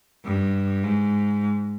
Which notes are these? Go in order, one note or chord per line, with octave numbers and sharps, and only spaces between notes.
G2
G#2